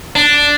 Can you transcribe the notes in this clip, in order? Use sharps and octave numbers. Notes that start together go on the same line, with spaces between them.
D4